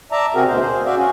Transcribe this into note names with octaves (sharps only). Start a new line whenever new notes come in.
D5 E5 A5 A#5
C3 C4 F#4 G#4 A#4
D2 B2 C5
G#4 C5
F#4 D5 E5 F5
C#4 F#4 G#4